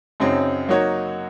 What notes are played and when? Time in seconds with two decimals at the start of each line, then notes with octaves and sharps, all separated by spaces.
0.20 F#2 C#3 F#3 C4 D#4
0.68 F#3 A#3 D#4 F#4 C#5